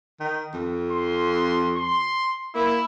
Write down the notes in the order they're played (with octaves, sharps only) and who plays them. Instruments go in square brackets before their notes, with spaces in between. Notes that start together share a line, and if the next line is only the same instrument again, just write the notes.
[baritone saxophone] D#3
F2
[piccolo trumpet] C6
C6
[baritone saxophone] A#3 [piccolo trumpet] E4